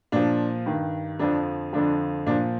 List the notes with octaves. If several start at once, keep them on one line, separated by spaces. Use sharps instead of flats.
A#2 F3 D4
G2 D#3
F2 D3 F3 D4
F2 D3 F3 D4
A#2 F3 D4